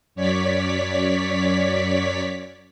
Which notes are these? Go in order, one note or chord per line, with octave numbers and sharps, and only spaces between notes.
F#2 C#5 D5 B6